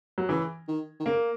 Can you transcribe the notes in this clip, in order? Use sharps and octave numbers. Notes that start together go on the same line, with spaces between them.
F#3
C#3 E3
D#3
D#3
C#3 A#3